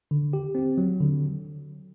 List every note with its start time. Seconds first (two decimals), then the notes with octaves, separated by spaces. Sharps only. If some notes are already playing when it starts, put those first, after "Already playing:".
0.11 D3
0.33 G4
0.55 C4
0.78 F#3
1.00 D3